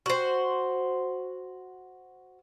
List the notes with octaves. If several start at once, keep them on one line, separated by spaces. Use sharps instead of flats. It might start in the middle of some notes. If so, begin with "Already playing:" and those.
F#4 C5